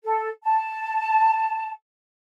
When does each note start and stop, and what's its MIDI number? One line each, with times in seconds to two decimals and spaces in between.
0.04 0.28 69
0.44 1.70 81